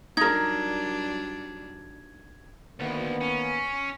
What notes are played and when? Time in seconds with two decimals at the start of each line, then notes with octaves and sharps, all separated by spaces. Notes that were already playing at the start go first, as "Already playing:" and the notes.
0.17 F#3 G3 D4 D#4 A#4 G#6
2.80 D2 D#3 A#3 B3
3.21 C#4